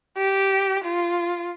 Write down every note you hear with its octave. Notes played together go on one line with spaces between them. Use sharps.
G4
F4